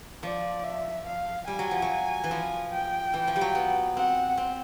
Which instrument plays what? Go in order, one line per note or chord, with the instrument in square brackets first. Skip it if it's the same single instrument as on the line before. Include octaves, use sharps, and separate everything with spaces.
[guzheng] F3 [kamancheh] D5
[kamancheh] E5
F5
[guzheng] G3 [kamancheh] G#5
[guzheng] F#3
F3
F#3
E3
F3
[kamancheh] G5
[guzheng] E3
F3
G3
F#3
B3
[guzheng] C4 [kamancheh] F#5
[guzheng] C4